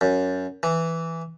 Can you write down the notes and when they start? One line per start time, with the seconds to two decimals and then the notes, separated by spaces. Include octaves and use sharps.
0.01 F#2
0.63 E3